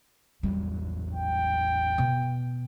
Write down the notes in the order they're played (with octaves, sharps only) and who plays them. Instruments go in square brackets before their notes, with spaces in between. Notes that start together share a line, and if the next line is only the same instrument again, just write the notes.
[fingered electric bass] A1 E2 F#3 [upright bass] G3
[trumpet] G5
[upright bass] B2